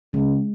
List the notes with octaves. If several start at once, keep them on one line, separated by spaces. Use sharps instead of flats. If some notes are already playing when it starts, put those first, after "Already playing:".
C#3 G#3